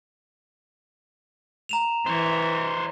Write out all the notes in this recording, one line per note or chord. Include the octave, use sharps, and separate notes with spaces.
A#5 E7 F7
E3 C5 C#5